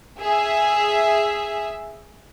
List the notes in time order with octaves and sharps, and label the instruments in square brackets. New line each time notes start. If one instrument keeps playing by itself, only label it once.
[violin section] G#4 E5